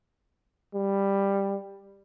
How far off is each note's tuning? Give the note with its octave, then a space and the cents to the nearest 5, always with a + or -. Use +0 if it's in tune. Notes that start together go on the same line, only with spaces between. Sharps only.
G3 +10